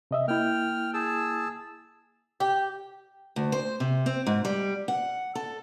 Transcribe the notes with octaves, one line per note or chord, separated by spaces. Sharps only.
C3 D#5 E5
A#3 E4 G5 F6
G#4 A5 E6
G4
D2
C5
C3
C4
G#2
G3
F#5
A4